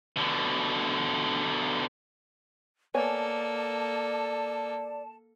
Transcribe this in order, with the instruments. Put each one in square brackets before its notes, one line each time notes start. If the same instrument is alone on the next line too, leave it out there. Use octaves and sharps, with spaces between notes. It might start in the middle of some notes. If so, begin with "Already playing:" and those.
[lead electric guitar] B2 D3
[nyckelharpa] A#3 A4 [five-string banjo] B3 C#5 G#5 [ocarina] D5 [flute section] A5